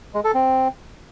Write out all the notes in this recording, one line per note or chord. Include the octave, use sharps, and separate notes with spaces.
G#3
A4
C4